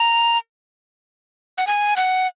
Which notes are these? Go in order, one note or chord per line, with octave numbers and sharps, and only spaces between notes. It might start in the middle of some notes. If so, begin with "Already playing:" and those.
Already playing: A#5
F#5
G#5
F#5